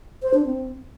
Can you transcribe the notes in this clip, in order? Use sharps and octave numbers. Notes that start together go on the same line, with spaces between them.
C5
D4
C4